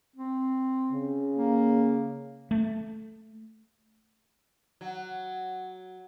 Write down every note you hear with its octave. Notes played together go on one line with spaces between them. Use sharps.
C4
C#3
A#3
A3
F#3